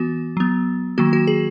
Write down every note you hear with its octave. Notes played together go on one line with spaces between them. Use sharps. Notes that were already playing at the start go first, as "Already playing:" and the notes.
Already playing: E3 B3 F#4
F#3 B3
D#3 F#3 A#3 F#4
F#4
G#4